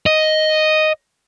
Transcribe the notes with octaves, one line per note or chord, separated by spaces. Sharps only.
D#5